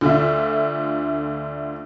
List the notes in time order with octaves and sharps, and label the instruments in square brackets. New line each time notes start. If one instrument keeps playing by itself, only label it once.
[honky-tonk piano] D2 D3 D4 F4 E5